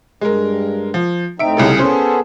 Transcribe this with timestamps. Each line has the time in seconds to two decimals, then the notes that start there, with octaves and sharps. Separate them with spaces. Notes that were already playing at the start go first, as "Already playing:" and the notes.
0.21 G2 G#3 A#4
0.94 F3
1.39 A2 C4 D#4 E5 D7
1.57 C2 C#3 A4
1.78 B3 C#4 G#4 A4 C5